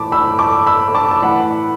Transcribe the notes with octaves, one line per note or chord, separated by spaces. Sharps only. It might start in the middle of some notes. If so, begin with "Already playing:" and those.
Already playing: A2 E3 A5 B5 D6
B5 E6
A5 D6
B5 E6
A5 D6
A5
A2 E3 F#5 B5